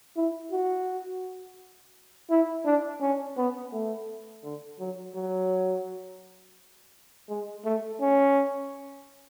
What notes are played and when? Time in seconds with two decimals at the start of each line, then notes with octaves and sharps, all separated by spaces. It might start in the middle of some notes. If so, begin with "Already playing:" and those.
0.16 E4
0.51 F#4
2.30 E4
2.65 D4
3.01 C#4
3.37 B3
3.72 A3
4.43 D3
4.79 F#3
5.15 F#3
7.29 G#3
7.65 A3
8.00 C#4